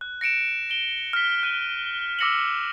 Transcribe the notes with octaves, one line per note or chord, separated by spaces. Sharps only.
F#6
A#6 C#7 D7 E7
D7 G7
F6 B6
F#6 D#7
D6 E6 A#6 C#7 E7 F#7